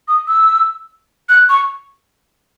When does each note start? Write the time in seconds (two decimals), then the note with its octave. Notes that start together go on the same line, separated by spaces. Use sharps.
0.08 D#6
0.28 E6
1.29 F#6
1.49 C#6